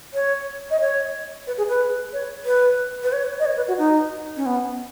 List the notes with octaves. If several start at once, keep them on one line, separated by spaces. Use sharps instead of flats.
C#5
D#5
C#5
B4
G#4
B4
C#5
B4
B4
C#5
D#5
C#5
B4
F#4
D#4
C#4
B3